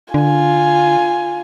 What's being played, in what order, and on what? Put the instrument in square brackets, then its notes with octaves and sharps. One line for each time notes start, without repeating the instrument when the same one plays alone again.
[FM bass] D3 [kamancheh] F4 G#5